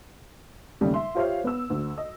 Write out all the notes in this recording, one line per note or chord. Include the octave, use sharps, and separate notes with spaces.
D#2 C#3 G3 A3
E5 C6
F4 G4 C5 C#5 E5 F5
B3 E6
D2
D#5